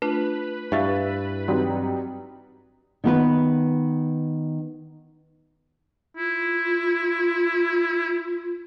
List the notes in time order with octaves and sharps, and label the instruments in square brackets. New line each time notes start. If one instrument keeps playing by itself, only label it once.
[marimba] A3 D4 F4 [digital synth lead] B4
[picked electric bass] G2 [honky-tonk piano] E4 E5 A6 [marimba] F5 C#6
[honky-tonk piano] F#3 G3 D#4 [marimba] C4
[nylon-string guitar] D#3 B3 B4
[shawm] E4 [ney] F4